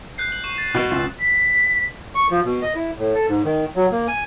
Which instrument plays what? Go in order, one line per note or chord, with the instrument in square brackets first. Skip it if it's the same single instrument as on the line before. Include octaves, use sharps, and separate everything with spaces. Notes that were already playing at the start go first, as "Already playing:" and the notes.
[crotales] F#6 G6 C7
F#7
C#6 D#7 E7
A6
[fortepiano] B2
C#2
[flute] B6
[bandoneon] C#6
F3
B2
D#5
E4
A2
A4
G#2
D#3
F#3
A#3
G#5